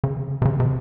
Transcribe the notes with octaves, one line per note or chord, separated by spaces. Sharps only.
C#3
C3
C#3
C3